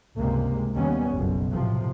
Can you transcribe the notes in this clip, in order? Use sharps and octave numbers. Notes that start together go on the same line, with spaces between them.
C#2 G2 C3 G#3 A#3
D#2 G3 B3 C#4
F#1 B1 F#2 B2
A2 C3 F3